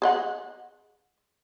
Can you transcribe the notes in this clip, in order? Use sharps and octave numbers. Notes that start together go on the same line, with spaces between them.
G#4 D#5 F#5